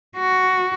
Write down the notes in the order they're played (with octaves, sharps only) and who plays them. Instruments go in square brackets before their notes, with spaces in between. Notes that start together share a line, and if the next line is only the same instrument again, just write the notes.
[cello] F#4